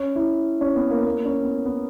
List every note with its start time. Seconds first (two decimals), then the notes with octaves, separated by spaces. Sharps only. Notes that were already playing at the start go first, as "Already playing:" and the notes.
Already playing: C#4
0.16 E4
0.61 C#4
0.76 B3
0.90 A#3
1.05 A#3
1.25 C#4
1.45 B3
1.65 B3